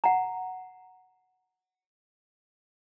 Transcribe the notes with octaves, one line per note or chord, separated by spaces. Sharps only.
F#5 A#5